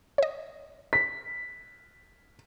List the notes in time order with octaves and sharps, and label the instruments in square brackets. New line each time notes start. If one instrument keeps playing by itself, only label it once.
[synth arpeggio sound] C#5 D#5
[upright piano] B6